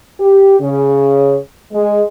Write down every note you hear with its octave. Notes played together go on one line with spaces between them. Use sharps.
G4
C#3
G#3